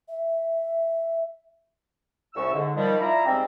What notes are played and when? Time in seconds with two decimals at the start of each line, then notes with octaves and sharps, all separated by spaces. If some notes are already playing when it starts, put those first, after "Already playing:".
0.08 E5
2.34 C2 A2 C#4 C#6 E6
2.52 G#2 D3
2.74 D#3 F3 G3
2.99 D4 E4 F4 E5 A#5
3.25 G#2 G3 G#3 C4